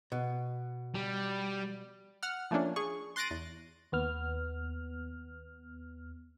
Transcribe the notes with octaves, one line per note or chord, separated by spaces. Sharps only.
B2
G3
F#5 F6
F3 A3 A#3 C#4 D4
G#4 C#6
C6 F#6 A6 A#6 D7 D#7
E2
D#2 B3 F6